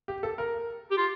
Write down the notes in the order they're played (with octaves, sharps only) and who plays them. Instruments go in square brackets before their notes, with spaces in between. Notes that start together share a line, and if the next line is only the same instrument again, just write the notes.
[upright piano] G4
A4
A#4
[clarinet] G4
F4